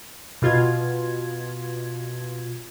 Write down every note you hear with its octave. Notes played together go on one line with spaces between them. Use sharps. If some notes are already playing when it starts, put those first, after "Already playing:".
B2 F4 G#6